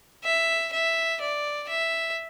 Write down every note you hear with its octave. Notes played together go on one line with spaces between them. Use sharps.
E5
E5
D5
E5